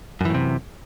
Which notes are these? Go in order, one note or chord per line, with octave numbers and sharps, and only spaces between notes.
F#2 A2 C3 E3